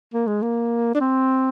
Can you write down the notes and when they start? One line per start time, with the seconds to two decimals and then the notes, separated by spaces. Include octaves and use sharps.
0.14 A#3
0.27 G#3
0.42 A#3
0.95 D4
1.00 C4